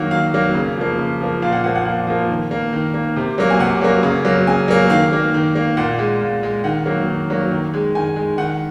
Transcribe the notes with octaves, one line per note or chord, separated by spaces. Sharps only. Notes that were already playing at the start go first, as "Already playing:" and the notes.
Already playing: D#3 F#3 A#3 F#5
D#3 F5
F#3 A#3
C#3
F3 A#3
C#3
F3 A#3
A#2 F5
F#5
F3 A#3 F#5
F#5
A#2 F#5
F3 A#3
D#3
A#3
D#3
A#3
C3
F#3 A#3
G#5
C3 F#5
F#3 A#3
C#3
F#3 A#3
C#3 G#5
F#3 A#3
D#3 F5
A#3
D#3
A#3
A#2 F#5
G#3
A#2
G#3
D#3 F#5
F#3 A#3
D#3
F#3 A#3
D#3
G#3
D#3 G#5
G#3
D#3 F#5